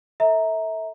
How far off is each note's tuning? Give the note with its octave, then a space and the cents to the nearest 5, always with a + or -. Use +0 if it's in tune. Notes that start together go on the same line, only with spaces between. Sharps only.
A4 +20 E5 -30 A#5 +0